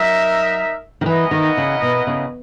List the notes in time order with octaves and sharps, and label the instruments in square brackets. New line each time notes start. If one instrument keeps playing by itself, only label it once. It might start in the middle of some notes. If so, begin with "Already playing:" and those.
Already playing: [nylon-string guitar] F#3 [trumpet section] D#4 A#4 E5
[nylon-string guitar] D#3
[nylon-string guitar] E3 [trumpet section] B3 E4 A#4 D#5 F#5
[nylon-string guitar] D#3
C#3
B2
C#3